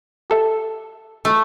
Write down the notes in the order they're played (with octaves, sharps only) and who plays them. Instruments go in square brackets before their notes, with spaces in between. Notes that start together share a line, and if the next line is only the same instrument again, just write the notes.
[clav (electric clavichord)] G4 A4 E5
[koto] A3